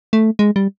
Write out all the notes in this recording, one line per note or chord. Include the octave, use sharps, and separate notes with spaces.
A3
G#3
G3